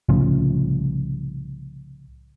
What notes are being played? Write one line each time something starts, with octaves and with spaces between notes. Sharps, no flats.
C2 A2 C#3 F3